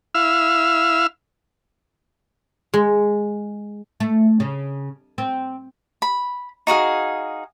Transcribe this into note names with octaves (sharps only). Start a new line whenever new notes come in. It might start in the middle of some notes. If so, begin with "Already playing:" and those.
E4 F5 E6 F6
G#3
A3
C#3
C4
B5
D#4 F#4 G#4 F5